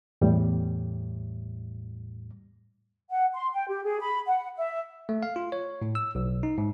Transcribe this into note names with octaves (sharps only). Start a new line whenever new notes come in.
E2 A2 G3
F#5
C6
G5
G4
G#4
B5
F#5
E5
A3
F5
F4
C#5
A2
E6
B1
D#4
G#2